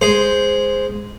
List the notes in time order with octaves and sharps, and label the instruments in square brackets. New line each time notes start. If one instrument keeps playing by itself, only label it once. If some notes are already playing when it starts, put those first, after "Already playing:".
[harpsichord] G#3 C5